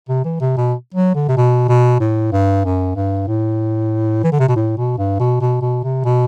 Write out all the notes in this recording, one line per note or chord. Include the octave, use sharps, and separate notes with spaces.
C3
E3
C3
B2
F#3
D3
C3
B2
B2
A2
G2
F#2
G2
A2
E3
D3
C3
B2
A2
B2
G2
B2
B2
B2
C3
B2